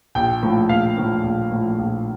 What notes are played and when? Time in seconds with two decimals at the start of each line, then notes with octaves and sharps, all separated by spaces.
0.15 A#1 G5
0.43 A2 F3 A#3
0.69 A#1 F5
0.97 A2 F3 A#3
1.24 A#1
1.51 A2 F3 A#3
1.79 A#1